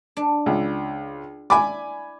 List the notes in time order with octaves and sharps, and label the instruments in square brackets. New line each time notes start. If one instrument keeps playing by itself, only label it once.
[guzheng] D4
[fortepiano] C#2
[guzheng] E4 D5 [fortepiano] G#5 B5 D6